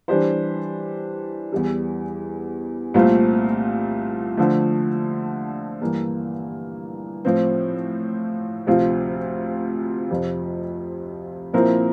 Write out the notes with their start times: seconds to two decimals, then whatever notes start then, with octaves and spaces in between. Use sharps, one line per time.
0.08 E3 G3 D4 G4 C5
1.52 E2 E3 G3
2.94 C2 A#2 A3 C4 F4
4.37 D3 F3 A3
5.81 G2 E3 A#3
7.25 A2 F3 C4
8.67 D2 C3 F3 C4 F4
10.11 F2 C3 F3
11.53 A#2 F3 C4 E4 A#4